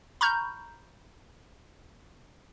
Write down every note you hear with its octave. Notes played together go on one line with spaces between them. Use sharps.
A#5 B5 C#6 F6 G6